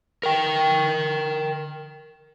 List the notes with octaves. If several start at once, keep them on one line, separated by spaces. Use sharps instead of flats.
A#4 G5